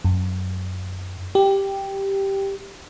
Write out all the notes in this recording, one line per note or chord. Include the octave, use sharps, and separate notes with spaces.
F#2
G4